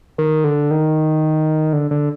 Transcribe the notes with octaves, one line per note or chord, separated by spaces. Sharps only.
D#3
D3
D#3
D3
D3